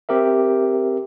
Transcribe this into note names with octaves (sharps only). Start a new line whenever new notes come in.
C4 G4 A#4 E5